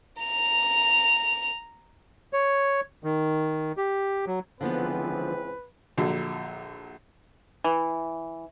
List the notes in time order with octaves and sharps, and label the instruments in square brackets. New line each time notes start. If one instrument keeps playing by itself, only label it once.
[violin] A#5 F7
[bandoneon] C#5
D#3
G4
F#3
[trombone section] C#2 E3 C4 [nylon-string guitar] D3 F3 B3 [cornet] B4
[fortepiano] A#1 D3 F#3
[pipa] E3